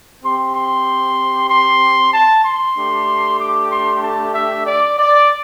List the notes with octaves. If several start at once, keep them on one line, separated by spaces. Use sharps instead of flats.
C4 G4 C6
C6
C6
A5
C6
A3 D4 G4
D6
C6
A5
E5
D5
D5